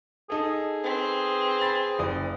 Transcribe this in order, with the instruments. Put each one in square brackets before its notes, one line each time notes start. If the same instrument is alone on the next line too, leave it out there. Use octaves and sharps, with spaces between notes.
[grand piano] D#4 A4 [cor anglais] G#4
[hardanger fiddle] C4 B4
[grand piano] B5 A6
F#1 D5 D#6